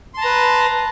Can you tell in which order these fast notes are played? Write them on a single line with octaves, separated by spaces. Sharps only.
C6 A5 A#5 B4